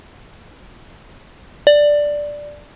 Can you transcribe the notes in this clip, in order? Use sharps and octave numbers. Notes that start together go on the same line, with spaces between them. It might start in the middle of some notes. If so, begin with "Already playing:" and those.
D5